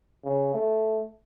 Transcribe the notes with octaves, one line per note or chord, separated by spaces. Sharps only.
C#3
A3